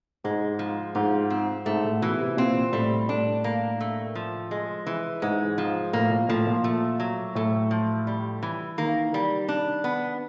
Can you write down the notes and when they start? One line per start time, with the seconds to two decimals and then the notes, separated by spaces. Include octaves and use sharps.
0.24 G#2 G#3
0.59 F3
0.95 G#2 F4
1.30 C4
1.66 G#2 A3
1.84 A2
2.01 B2 E3
2.20 C3
2.37 A#2 C4
2.73 A2 G3
3.09 A2 D4
3.44 A#3
3.80 A3
4.15 F3
4.51 G#3
4.86 E3
5.22 G#2 G#3
5.58 F3
5.93 A2 A#3
6.11 A#2
6.29 A2 F3
6.47 A#2
6.64 A3
7.00 F#3
7.35 A2 A3
7.71 F3
8.07 G3
8.43 E3
8.78 D#3 A#3
9.14 G3
9.49 D4
9.84 B3